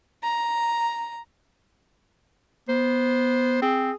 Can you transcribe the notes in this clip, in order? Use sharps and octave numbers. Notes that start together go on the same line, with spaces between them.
A#5
B3 C5
C4 G#4